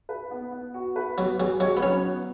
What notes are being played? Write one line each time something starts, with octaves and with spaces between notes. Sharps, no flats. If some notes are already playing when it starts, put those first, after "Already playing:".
B4
B3
B3
F#4
B4
F#3 B3
F#3 G#4
F#3 C#5
B3
F#3 C#4
B3